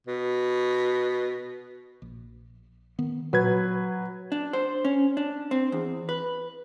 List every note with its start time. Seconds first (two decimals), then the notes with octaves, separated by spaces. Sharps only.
0.07 B2
2.02 A#1
2.98 D#3 B3
3.33 A#2 F#3 B4 G#6
4.32 D4
4.53 C5
4.85 C#4
5.17 D4
5.51 C4
5.72 E2
6.09 B4